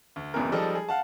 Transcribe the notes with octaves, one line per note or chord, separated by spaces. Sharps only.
D2
D1 G#1 F#2 B2 E3 A#4
F3 G3 G#3 D#4 A4 D5
G#4
F5 F#5 A5